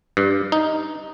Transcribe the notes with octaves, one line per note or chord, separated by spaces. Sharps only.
G2
D#4